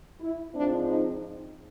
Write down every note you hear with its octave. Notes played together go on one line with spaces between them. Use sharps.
E4
G#2 F3 G#3 C4 D4
D#4